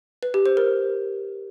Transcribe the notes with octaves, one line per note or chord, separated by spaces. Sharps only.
B4
G4
C5
A#4